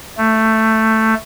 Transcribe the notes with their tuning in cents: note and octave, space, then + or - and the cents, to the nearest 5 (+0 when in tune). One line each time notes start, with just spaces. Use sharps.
A3 +10